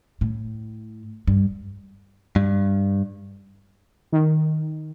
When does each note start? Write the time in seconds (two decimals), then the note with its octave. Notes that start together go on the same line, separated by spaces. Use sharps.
0.21 A2
1.27 G2
2.36 G2
4.12 D#3